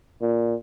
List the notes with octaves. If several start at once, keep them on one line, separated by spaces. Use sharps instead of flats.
A#2